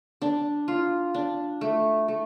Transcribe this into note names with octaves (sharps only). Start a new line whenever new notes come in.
D4
F4
D4
A3
A3